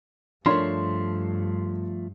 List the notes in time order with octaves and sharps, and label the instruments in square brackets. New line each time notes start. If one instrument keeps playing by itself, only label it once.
[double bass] G2 [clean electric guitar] F3 A3 [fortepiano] D4 A#4 C#5 [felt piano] C6